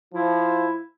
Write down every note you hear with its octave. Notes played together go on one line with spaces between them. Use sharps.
F3 E4